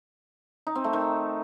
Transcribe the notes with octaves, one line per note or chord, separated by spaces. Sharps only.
D#4
C4
A3
D#3